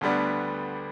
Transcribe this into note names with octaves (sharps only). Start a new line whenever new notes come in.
D2 D3 G3 B3 D4